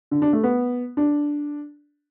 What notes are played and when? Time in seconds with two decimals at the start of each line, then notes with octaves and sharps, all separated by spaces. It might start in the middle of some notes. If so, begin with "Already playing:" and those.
0.11 D3
0.22 D4
0.33 A3
0.43 B3
0.97 D4